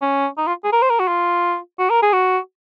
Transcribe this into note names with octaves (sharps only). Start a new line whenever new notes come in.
C#4
D#4
F4
G#4
A#4
C5
A#4
F#4
F4
F#4
A#4
G#4
F#4